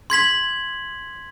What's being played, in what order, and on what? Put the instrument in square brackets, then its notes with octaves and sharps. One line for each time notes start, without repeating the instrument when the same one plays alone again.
[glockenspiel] C6 G#6 B6 F#7